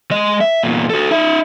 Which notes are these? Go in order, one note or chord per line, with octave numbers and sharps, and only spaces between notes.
G#3 D#5
E5
E2 A#2
F#4 A4
D#4 E5